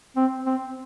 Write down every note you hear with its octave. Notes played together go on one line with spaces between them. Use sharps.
C4
C4